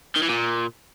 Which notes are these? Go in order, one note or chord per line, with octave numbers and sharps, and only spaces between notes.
D#3
E3
A#2